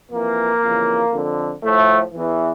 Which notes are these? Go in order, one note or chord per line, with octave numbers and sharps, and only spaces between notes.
F2 E3 A#3
F2 C#3 E3
F2 D3 F3
A2 F3 A3
E2 E3